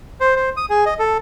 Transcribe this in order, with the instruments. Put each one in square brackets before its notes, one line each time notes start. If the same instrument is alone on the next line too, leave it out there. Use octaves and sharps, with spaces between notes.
[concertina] C5
C5
D#6
G#4
D#5
A4